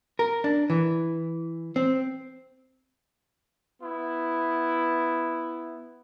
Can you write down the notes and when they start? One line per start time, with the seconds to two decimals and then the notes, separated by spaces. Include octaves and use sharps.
0.19 A#4
0.44 D4
0.70 E3
1.76 C4
3.82 B3 E4